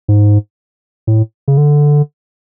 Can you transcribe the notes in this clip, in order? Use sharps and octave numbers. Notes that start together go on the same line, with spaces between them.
G#2
A2
C#3
D3